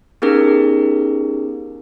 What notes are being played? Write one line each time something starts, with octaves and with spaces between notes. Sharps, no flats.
B3 C#4 D#4 G4 G#4 A#4